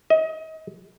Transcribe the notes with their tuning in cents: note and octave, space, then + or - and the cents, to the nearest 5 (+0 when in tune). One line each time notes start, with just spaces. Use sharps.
D#5 +30